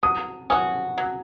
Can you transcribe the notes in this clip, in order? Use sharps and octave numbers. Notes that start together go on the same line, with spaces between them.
F#3 D#6
C#4 F#4 D#6
F#3